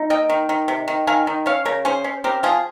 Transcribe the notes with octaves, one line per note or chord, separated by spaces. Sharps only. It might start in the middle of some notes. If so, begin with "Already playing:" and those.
Already playing: D#4
A#3 D#5 G5
D#3
D#3
C3
D#3
D#3 F5 G#5
D#3
C#4 C#5 F5
C#3 A#4 C#5
C#4 G#4 C5
C#4
C4 G4 A#4
F3 F4 G#4